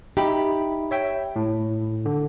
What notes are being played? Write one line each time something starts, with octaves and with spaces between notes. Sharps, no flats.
D#4 G4 E5 B5
C#5 E5 G5
A2
D3